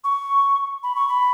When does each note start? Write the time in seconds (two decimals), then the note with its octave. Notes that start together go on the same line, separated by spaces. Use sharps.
0.04 C#6
0.83 B5
0.96 C#6
1.08 B5